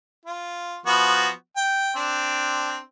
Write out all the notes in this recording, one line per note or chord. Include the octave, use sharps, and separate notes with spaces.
F4
F3 B3 F#4
G5
C4 D4